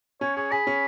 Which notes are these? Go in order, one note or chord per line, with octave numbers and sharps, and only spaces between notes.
C#4 C#5
G#4 C#5
G#4 B5
C#4